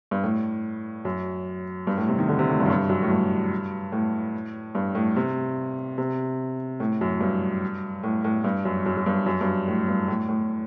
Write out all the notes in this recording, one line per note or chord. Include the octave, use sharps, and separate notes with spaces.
G2
A2
F#2
G2
A2
C3
D#3
D3
C3
A2
G2
F#2
G2
F#2
A2
G2
A2
G2
A2
C3
C3
A2
F#2
G2
A2
A2
G2
F#2
F#2
F#2
G2
F#2
G2
A2
G2
A2
A2